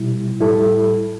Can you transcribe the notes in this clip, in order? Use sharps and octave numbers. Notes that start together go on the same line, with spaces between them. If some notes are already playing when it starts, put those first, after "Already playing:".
Already playing: B2 G3 E4
A2 G3 E4 A4